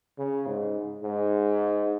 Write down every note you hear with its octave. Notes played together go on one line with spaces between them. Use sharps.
C#3
G#2
G#2